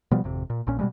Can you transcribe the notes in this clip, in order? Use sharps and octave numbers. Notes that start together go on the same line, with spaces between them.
B2 F3 G3 B3
G#1 F2 C3
A#2
A#1 A#2 C#4
B2 G3 G#3